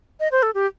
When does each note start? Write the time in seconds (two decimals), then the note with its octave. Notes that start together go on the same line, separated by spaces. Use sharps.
0.20 D#5
0.32 C5
0.43 A4
0.55 G4